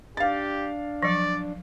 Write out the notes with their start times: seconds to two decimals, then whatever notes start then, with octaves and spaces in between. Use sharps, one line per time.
0.17 D4 G4 F5 A6
1.03 F3 F#3 D5